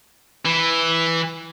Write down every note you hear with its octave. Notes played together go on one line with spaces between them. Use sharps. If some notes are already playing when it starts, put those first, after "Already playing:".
E3